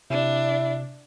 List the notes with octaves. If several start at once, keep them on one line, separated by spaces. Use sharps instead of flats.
C3 D4 E4